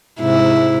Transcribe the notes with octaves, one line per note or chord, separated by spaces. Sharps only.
G#2 C3 E4